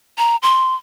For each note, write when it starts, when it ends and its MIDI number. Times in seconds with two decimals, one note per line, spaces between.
0.18 0.36 82
0.43 0.75 84